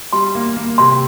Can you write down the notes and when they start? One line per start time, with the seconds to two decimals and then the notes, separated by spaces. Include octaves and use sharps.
0.13 G3 C6
0.35 A#3
0.56 A#3
0.78 C3 C6